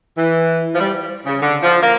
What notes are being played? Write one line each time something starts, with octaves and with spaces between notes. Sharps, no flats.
E3
F3
G3
C#3
D3
F3
A#3